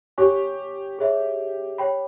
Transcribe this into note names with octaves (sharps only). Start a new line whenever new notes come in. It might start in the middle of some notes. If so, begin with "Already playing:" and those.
G4 C#5 G#5 C#6
G#4 C#5 E5
C#5 G5 B5